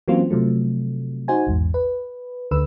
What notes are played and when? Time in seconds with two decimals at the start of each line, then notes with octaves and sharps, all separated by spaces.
0.08 E3 F#3 A#3 C4 C#4 F4
0.30 C3 F3 F#3 A3
1.28 D#4 F#4 C5 G#5
1.47 A#1 E2 G#2
1.74 B4
2.51 D2 D3 B4 E6